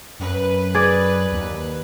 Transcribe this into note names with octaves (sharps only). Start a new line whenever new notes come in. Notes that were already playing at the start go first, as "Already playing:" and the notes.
F#2 B4
G#4 D5
D#2